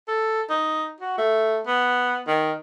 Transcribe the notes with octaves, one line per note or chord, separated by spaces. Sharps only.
A4
D#4
F#4
A3
B3
D#3